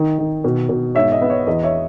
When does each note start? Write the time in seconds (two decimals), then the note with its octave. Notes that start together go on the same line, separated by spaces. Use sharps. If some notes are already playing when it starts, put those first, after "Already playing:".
Already playing: D#3 D#4
0.18 D#3
0.44 B2
0.69 B2
0.95 G#2 C#5 E5
1.12 D#5
1.22 B3
1.30 C#5
1.47 E2 D#5
1.63 C#5 E5